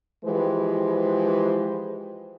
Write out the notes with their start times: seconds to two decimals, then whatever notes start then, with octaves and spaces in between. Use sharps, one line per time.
0.25 E3 F3 G#3 G4 B4 C5